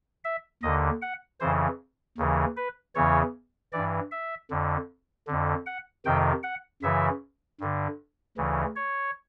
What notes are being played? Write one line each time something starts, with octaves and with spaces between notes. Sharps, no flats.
E5
D#2 D3 D#5
F#5
F2 C#3 E3 C5
D#2 C#3 E3
B4
E2 C#3 E3 C#5
G2 E3 D5
E5
F2 D3
F2 D3
F#5
F2 C3 D#3 G5
F#5
F#2 C#3 E3 E5
G2 D3
D2 C#3 E3
C#5